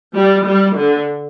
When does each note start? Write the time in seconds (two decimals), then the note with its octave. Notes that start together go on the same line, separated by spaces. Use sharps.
0.15 G3
0.45 G3
0.77 D3